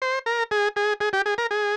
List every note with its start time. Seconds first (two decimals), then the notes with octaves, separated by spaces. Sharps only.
0.02 C5
0.26 A#4
0.51 G#4
0.76 G#4
1.01 G#4
1.13 G4
1.26 G#4
1.38 A#4
1.51 G#4